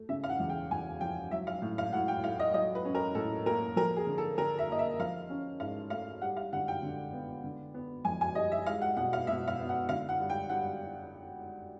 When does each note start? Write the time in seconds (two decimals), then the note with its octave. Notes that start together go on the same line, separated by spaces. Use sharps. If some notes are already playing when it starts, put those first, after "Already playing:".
Already playing: A3
0.09 C#3 E5
0.24 F5
0.29 F#5
0.40 E2
0.49 G5
0.71 E2 G#5
1.01 F3 G5
1.31 F#3 E5
1.47 F5
1.62 A2
1.78 F5
1.93 A2 F#5
2.08 G5
2.24 A3 F5
2.39 D#5
2.54 F#3 D#5
2.75 B4
2.85 C#4
2.95 A#4
3.15 A2 A4
3.46 A#3 A#4
3.76 F3 A#4
3.96 G#4
4.07 D3
4.18 A4
4.38 D3 A#4
4.59 E5
4.69 A#3 D#5
4.79 E5
4.99 F3 F5
5.30 C#4
5.60 G#2 F5
5.90 A3 F5
6.22 G3 F#5
6.37 F5
6.53 D3 F#5
6.68 G5
6.83 D3
7.13 B3
7.44 D3
7.74 B3
8.05 F2 G#5
8.21 G#5
8.35 G3 D#5
8.52 E5
8.66 G#3 F5
8.82 F#5
8.97 B2 F#5
9.13 F5
9.27 B2 E5
9.48 F5
9.59 B3
9.69 F#5
9.89 D3 F5
10.09 F#5
10.20 G2
10.30 G5
10.50 G2 F#5